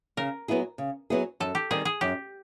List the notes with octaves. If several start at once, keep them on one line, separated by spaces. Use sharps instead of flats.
C#3 A#4
F#3 B3 E4 G#4
C#3
F#3 B3 E4 G#4
F#2 A4
G4
D#3 G3 C4 G#4
G#4
F#2 G4